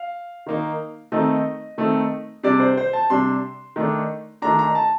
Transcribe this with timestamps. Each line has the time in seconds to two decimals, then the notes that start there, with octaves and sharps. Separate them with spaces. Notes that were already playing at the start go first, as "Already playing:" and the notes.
Already playing: F5
0.46 D#3 A#3 D#4
1.12 D#3 A3 C4 D#4 D#5
1.78 D#3 A3 C4 D#4
2.43 C3 G3 D4 D5
2.60 C5
2.77 C5
2.93 A5
3.10 C3 G3 D4 C6
3.76 D#3 A3 D4
4.42 D#3 A3 D4 A#5
4.59 A#5
4.75 A5